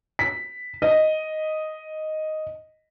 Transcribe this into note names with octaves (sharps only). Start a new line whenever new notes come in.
B6
D#5